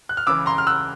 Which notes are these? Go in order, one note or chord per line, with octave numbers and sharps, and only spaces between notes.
F#6
F6
C#2 C#3 E3 D6 E6
A#5 C6
F6
E6 F#6